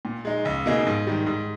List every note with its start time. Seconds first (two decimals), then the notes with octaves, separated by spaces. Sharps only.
0.05 A#2
0.25 G#3 D#4
0.45 C#2
0.66 B2 A#3 D#4 G#4
0.87 G#2
1.07 D#3 G3
1.26 G#2